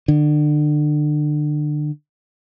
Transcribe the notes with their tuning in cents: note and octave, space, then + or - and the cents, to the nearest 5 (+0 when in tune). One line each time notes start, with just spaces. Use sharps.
D3 +30